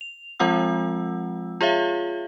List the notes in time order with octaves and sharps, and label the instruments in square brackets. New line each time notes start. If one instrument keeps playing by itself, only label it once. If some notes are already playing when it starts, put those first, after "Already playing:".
[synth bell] F7
F3 G#3 C4 F4 F#5 E6
F4 G#4 C#5 E5 F5